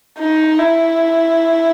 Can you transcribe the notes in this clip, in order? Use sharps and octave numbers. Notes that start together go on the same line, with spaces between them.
D#4
E4